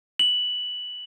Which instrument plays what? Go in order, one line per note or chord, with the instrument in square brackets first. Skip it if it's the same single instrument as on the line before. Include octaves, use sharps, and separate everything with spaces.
[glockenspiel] F#7